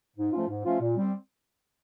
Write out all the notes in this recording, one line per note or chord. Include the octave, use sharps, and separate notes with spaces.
G#2
F3 A3 C#4 F4
G#2
F3 A3 C#4 F4
A#2
G3 C4